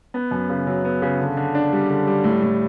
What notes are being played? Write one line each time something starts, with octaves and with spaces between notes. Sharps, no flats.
B3
F#2
C#3
F#3
B3
C#3
D3
D3
D4
G3
D3
G3
A2
A2